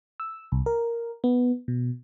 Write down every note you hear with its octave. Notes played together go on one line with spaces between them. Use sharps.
E6
C2
A#4
B3
B2